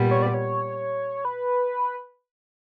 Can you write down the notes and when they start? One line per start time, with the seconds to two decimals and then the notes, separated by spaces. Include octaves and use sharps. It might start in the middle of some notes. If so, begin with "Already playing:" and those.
Already playing: A#2 G3 B3
0.11 C#5
0.22 D5
0.34 C#5
1.25 B4